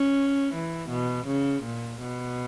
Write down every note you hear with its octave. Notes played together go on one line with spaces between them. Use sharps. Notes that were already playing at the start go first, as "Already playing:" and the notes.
Already playing: C#4
E3
B2
C#3
A#2
B2